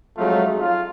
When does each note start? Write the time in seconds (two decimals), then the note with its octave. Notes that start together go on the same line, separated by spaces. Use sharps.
0.18 F2 F#3 G#3 A3 D#4 F4
0.60 F4